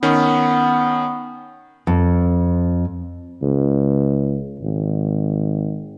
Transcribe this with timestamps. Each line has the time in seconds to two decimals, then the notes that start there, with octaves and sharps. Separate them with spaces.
0.03 D#3 B3 C#4
1.87 F2
3.42 C#2
4.60 G#1